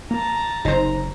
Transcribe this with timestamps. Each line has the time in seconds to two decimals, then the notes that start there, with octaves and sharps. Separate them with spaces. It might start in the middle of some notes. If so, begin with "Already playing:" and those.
0.11 A#3 A5 A#5
0.65 F#1 C3 D#4 C5 A#5